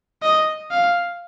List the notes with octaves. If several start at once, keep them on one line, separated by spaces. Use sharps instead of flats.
D#5
F5